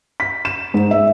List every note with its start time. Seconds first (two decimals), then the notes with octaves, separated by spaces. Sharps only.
0.20 B6
0.45 E7
0.74 G#2
0.91 E5